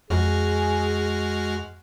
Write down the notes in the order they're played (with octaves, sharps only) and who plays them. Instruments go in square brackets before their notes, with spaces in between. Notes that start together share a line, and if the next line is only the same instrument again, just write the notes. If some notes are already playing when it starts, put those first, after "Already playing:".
[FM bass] F2 [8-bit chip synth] G#3 F#4 F6 [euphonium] G#4